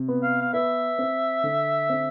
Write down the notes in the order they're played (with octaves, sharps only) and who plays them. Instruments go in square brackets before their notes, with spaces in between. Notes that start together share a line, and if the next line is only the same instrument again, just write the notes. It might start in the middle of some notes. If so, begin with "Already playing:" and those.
Already playing: [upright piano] C3
B3
[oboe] F5
F5
[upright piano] B4 [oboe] E5
[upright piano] C4
D3
C4